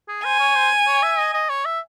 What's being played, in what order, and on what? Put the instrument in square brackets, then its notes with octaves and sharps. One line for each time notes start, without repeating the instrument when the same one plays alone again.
[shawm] G#4
[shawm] C5 [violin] G#5
[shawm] C#5
C5
C#5
E5
D#5
D#5
C#5
E5